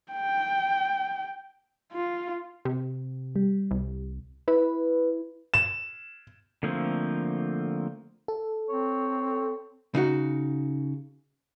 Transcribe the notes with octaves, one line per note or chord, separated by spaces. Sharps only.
G5
F4
C3
G3
C2
E4 B4
E7
D3 F3 A3 A#3 C4
A4
C4 C#5
C#3 D#4 F#4